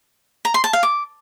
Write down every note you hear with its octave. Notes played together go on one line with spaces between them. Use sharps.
A#5
C6
A5
F5
D6